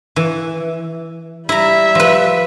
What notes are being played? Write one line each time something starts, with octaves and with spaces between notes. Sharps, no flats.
E3
G3 E4 E5 A#5
F3 B4